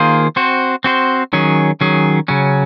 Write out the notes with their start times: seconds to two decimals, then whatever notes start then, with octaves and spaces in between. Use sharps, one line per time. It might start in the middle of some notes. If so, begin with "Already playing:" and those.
Already playing: D#3 A#3 F4 G#4 C5
0.36 C4 F#4 C5
0.84 C4 F#4 C5
1.33 D#3 F#3 C#4 G#4
1.81 D#3 F#3 C#4 G#4
2.28 C#3 F#3 C#4